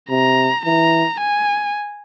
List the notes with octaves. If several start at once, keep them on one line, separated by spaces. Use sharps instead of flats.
C3 A#5
E3 A#5
G#5